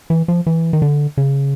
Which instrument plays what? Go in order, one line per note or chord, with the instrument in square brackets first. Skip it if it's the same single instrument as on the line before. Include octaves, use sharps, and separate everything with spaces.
[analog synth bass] E3
F3
E3
D#3
D3
C#3